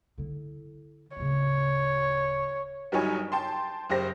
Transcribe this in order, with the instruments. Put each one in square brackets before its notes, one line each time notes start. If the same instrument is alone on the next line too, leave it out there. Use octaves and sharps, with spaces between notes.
[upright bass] D3 E4
[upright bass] D1 C#3 [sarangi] C#5
[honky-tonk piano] G1 F#3 G3 D#4 C#5 G#5
G5 A5 C6
F#1 G4 C5 A#6